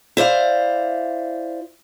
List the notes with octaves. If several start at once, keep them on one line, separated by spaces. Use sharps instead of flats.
E4 C5 D5 F5